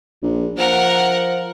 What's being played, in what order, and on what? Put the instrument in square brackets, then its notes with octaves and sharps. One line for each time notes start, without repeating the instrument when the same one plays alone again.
[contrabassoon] A#1
[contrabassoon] F3 [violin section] A#4 F#5